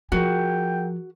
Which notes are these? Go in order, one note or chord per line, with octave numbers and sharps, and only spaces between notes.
F3 F#4 G#4 A#4 F#5 G5